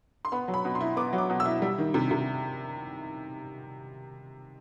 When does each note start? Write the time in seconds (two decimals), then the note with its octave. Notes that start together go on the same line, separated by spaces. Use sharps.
0.25 C6
0.32 B3 B5
0.48 F#3
0.54 B5
0.65 B2
0.75 C6
0.81 E4
0.96 B3 D6
1.13 F#3
1.18 D6
1.30 B2
1.40 E6
1.46 E4
1.62 G3
1.78 D#3
1.94 C3
2.11 C3